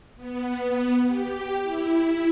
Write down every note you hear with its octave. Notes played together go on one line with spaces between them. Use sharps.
B3
G4
E4